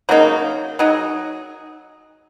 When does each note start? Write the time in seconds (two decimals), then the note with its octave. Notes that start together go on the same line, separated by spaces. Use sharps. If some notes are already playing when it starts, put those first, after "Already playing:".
0.09 C#3 F#3 A#3 D#4
0.79 F#3 D#4 G#4